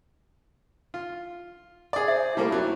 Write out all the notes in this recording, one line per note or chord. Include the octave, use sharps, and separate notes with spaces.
F4
G#4 D5
C5 E5
G3 A3 A#3 E4
F#3